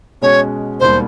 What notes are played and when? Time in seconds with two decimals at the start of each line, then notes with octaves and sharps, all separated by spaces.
0.21 B2 G#3 C#4 F#4 C#5
0.80 E1 D#2 D#3 G3 C5